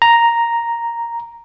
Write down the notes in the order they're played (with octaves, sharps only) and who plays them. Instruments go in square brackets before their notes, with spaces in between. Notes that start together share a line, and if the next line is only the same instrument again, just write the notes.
[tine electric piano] A#5